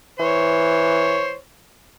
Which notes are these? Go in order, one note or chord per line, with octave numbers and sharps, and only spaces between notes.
E3 C5 C#5